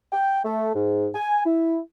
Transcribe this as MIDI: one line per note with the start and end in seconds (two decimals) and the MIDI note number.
0.13 0.40 79
0.45 0.73 57
0.75 1.09 44
1.15 1.42 80
1.45 1.78 64